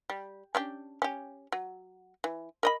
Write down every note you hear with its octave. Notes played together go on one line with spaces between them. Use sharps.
G3
C#4 D4 G4
C#4 G4
F#3
E3
A#4 D#5 B5